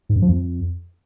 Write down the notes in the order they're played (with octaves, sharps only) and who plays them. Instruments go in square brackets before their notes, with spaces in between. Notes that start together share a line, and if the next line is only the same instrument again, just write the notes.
[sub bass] G#2
F#2
F3
F2